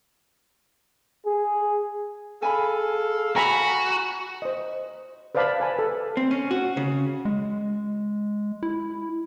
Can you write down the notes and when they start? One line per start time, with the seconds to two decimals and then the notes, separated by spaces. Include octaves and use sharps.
1.26 G#4
2.42 G#4 A4 F5 G#5 B5
3.36 F#4 G#5 A#5 B5
4.42 C5 D#5
5.35 B4 C5 D5 F5 A5 B5
5.60 B4 G#5 A5
5.79 A4
6.17 C4
6.31 C#4
6.51 F#4
6.77 C#3
7.25 G#3
8.63 E4